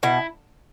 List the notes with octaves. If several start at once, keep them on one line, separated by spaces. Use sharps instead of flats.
B2 E4